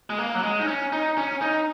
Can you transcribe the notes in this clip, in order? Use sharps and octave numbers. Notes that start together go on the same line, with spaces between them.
G#3
A#3
F#3
G#3
D#4
C#4
D#4
C#4
D#4